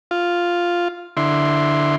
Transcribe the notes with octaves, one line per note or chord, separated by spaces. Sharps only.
F4
D3 E4 C6